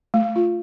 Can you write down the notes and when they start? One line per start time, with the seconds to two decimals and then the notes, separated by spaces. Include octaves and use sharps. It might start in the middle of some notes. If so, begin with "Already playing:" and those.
0.14 A3
0.36 F4